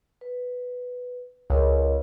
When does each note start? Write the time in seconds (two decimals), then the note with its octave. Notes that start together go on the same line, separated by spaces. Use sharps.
0.21 B4
1.50 C#2 A#4 C#5 D#5